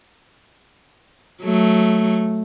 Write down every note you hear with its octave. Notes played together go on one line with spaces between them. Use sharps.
F#3 A3